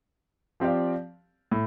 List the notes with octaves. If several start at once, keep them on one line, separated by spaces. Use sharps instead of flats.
F3 C4 G4 D5 F5
A2